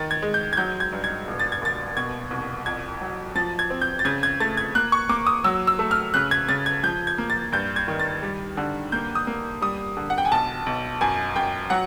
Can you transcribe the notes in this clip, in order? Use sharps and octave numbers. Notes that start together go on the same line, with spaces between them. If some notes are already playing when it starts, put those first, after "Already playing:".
Already playing: D#3 A6
G#6
G#3
G6
G#6
F#3 G6
G#6
G2
G#6
E1
A6
G#6
D#2 A6
B2 G#6
C2
F2 G#6
F#3
F3 A6
G#6
C4
G6
A6
C#3 G#6
G#6
A3 A6
G#6
A#3 F#6
C#6
A#3 D6
D#6
F#3 E6
E6
A3
F6
C#3 F#6
G#6
C#3 A6
G#6
F3 G6
G#6
A#3
A6
G2 G6
G#6
D#3
A6
G3
D3
A#3 G6
D#6
A#3
G3 D#6
D3
F#5
G5
G#5
B1 A5
B1
F#2 G#5
F#2 G5
F#3 F#5